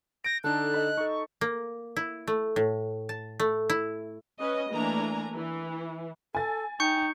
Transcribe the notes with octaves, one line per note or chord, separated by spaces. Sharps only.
G6 A#6 D7
D3 D4 D#4 A4 F#6
D#5 A5 B5
D#4 A4 C#6
A#3
E4
A3
A2
A5
A3
E4
C#4 B4 D#5
E3 A3 A#3 D4 G#5 A#5
E3
A4 G#5 A6
D#4 G5 C#6 G6 C#7